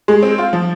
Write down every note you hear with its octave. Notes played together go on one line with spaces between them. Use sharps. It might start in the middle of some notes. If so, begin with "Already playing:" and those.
G#3
C4
F4
F3